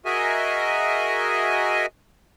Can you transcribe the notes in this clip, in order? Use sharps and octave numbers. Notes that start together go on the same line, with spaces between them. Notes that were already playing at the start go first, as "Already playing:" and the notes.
F#4 G#4 A#4 D#5 E5 G#5